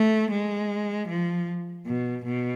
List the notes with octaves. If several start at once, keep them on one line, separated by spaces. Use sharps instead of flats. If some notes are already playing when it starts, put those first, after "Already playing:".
Already playing: A3
G#3
F3
B2
B2